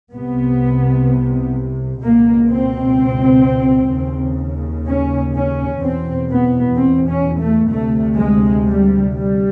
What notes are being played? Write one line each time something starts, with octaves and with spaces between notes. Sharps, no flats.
C2 C3 B3
C#2 B2 A#3
C4
D#2 C#3
C#4
C#4
E2 B2 C4
B3
C4
C#4
A3
D2 C3 A3
G#3
G3
G3